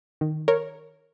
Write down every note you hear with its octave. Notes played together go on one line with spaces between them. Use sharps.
D#3
A#4 C#5